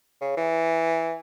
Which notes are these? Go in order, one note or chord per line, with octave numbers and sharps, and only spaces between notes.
C#3
E3